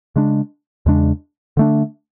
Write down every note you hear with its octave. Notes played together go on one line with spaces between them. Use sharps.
C#3 G#3 D4
E2 C#3 G#3 D4
D3 A3 D4